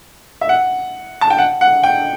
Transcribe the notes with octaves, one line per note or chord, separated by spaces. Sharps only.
E5
F#5
A5
G5
F#5
F#5
G5